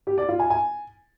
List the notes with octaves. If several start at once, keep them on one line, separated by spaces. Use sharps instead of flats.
G4
D5
F4
G#5
G#5